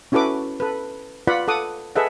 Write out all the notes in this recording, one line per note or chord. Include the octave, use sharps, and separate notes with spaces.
C#4 E4 F#4 A4 B4 D6
A4 B4
F4 B4 D5 F5 F#5 B5
A4 F#5 D6 D#6
G#4 A4 B4 D#5 E5 F#5